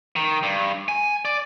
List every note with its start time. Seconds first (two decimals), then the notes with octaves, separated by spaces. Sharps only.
0.16 D#3
0.43 G2
0.88 G#5
1.25 D5